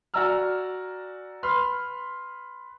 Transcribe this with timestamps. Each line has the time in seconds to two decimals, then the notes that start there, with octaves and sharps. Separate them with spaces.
0.14 F#4 D5 G#5 A#5 E6 F6
1.43 B4 B5 C6 F6